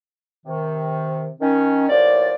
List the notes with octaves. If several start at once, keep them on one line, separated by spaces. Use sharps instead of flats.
C3 D#3
D#3 C#4
D#2 A2 F3 D5